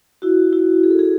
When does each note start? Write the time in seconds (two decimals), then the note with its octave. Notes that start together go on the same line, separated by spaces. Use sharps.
0.22 E4 F#4
0.53 E4 F#4
0.83 G#4
0.91 A4
0.99 F#4 G#4